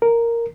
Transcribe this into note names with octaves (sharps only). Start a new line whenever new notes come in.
A#4